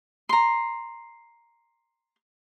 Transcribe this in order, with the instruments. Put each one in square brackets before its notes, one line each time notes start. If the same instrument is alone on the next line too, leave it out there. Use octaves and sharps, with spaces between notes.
[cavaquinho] A#5 C6